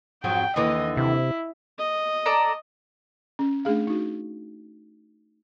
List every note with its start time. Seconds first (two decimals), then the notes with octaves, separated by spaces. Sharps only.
0.24 F2 G#2 F#3 G5
0.56 D#2 D3 E3 D#5
0.97 C3 E4
1.78 D#5
2.26 A4 D5 A#5
3.39 C#4
3.65 A3 D4 G#4 F5
3.87 D#4 F#4